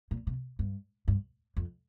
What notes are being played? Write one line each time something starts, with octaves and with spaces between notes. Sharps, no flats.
A#2
C3
G2
G2
F2